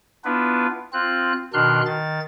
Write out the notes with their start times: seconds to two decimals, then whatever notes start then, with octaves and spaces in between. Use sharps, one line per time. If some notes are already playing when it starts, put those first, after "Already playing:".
0.25 B3 D4 E4 F4 B4
0.93 C4 F4 F#6
1.53 B2 D#3 D4 C6 F6 F#6
1.86 D#3 A6